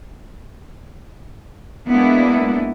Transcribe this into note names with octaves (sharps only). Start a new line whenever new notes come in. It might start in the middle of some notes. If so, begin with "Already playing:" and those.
G#3 A#3 B3 D4 E4